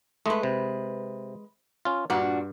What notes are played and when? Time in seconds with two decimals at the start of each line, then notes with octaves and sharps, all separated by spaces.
0.26 G#3 A3 B4
0.43 C3
1.85 C#4 F4
2.10 G2 A#2 D4 F#4